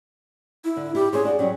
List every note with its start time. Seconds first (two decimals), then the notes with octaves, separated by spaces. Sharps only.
0.65 E4
0.77 D3
0.95 E4 G4
1.13 C#4 G#4 C5 C#5
1.25 D4 F#4
1.39 F#3 G3 C#4 G#4